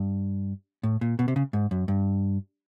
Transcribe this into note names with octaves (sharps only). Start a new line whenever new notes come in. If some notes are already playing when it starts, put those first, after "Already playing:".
Already playing: G2
A2
A#2
B2
C3
C#3
G#2
F#2
G2